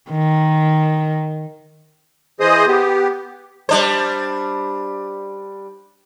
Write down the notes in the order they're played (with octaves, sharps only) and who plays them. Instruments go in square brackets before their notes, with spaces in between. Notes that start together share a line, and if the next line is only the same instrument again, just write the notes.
[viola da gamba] D#3
[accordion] E3 G#4 C5 D#5 D#6
B3 G4
[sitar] G3 D4 C5